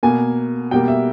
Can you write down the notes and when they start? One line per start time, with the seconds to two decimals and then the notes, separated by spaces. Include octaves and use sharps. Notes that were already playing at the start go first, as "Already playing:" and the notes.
0.03 B2 A#3 G#5
0.71 B2 G3 A#3 G5
0.88 E5